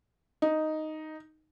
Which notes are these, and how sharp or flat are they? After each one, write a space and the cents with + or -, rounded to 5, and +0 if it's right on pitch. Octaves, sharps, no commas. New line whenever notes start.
D#4 +0